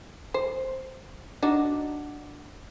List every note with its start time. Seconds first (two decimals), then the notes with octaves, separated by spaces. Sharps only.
0.34 C5
1.43 D4 D#4 F#4